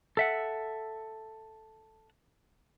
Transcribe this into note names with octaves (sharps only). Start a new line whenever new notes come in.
A4 E5 F#5